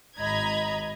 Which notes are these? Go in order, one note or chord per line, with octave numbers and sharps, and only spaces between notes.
G#1 D#5 A#5 B5 G#6